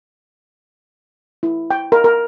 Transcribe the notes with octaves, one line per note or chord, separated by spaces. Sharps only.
E4
G5
A#4
A#4